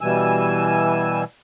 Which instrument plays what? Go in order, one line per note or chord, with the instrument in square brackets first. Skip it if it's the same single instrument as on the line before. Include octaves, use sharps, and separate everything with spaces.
[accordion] B2 E3 G3 G#5 E6